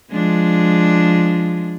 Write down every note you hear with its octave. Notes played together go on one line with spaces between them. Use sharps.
F3 G#3 D4